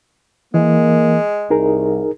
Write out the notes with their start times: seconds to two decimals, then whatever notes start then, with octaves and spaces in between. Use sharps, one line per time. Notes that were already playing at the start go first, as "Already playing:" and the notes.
0.54 E3 G#3 A#3
1.50 C2 D#4 G#4 A#4